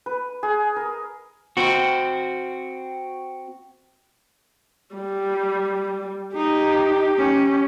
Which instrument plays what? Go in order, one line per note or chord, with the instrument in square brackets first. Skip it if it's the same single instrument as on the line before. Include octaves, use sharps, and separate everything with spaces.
[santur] B4
G#4
A#4
[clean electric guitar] C4 F#4
[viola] G3
[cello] D#4 [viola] G4
[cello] C#4